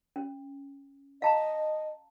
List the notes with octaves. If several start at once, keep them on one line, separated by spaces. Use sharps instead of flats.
C#4
D#5 F5 A5 A#5